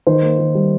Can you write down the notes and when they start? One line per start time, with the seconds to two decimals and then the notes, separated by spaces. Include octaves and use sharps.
0.07 D#3 C5
0.22 A#3
0.39 D#3
0.55 G3